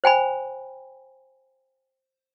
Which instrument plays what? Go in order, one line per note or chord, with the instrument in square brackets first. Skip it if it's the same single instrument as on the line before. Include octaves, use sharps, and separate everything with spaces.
[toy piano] C5 G5 G#5 B5